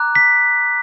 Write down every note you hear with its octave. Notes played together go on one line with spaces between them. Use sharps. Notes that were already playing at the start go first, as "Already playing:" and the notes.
Already playing: A#5 D6 F#6
B6